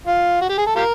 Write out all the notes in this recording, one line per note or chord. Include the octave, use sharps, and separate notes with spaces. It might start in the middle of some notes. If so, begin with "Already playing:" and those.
F4
F#4
G4
G#4
A4
F4 G4 A#4